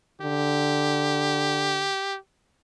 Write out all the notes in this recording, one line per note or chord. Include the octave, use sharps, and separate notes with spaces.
D3 G4